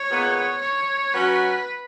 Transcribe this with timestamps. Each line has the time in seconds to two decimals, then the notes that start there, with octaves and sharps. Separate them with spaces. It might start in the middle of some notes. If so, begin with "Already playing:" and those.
Already playing: C#5
0.09 A#2 G#3 B3
0.61 C#5
1.14 F#3 C#4 F#4 B4